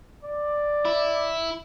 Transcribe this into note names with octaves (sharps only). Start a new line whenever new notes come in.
D5
E4